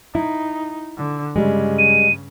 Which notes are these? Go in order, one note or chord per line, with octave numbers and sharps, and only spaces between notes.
D#4 E4
D3
G2 C#3 G3 G#3
D#7